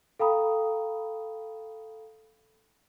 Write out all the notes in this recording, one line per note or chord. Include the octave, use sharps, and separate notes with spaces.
A4 F5 G5 A#5 B5 D#6